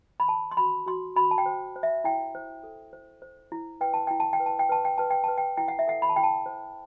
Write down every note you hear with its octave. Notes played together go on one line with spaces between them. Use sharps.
B5
C5 A5
C6
F#4 B5
F#4 C6
F#4 B5
A5
G5
C5
C5
E5
E4 G5
C5
A4
C5
C5
E4
B4 G5
A5
E4 G5
A5
G5
B4
A5
G5
B4 A5
G5
B4 A5
G5
B4 A5
G5
E4 G5
F#5
E5
A4 F#5
B5
A5
E4 G5
A5
C5